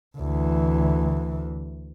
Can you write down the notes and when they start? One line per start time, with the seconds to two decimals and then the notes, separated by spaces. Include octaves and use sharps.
0.18 D2 E3